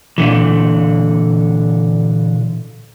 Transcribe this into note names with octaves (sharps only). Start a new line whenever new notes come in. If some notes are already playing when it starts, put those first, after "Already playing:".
A#2 D3 E3